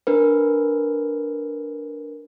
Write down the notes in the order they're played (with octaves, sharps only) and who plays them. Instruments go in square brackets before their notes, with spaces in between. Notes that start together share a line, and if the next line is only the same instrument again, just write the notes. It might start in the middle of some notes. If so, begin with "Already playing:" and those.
[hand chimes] D4 A#4 B4